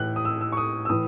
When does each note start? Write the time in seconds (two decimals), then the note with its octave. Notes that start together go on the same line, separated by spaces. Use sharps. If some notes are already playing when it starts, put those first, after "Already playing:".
Already playing: A2 E3 F#6
0.16 D#6
0.25 E6
0.41 E6
0.52 C#6
0.57 D#6
0.85 E6
0.89 A2 E3 D#6